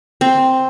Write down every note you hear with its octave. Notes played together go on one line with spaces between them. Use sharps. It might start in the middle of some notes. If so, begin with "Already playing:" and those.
C4